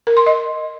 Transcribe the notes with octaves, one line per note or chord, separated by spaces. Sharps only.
A#4
C6
D#5